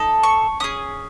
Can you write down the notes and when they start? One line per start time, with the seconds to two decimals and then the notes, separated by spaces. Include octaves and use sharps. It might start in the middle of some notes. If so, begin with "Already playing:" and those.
Already playing: D#4 A4
0.23 C#6
0.60 C#4 G#4 D#6